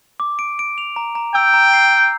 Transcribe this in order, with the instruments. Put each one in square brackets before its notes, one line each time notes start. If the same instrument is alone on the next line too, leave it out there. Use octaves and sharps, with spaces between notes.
[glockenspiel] D6
D7
D7
F7
A#5
A#5
[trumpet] G5 [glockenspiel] E6
[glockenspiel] A#5
C7
G6